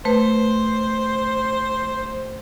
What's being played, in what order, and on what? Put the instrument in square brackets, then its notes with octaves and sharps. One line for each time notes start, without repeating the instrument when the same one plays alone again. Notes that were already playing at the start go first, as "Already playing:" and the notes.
[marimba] A3 B4 [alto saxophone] C5